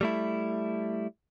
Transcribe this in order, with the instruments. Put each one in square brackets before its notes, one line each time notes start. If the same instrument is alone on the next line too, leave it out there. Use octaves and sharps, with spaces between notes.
[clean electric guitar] G3 A3 E4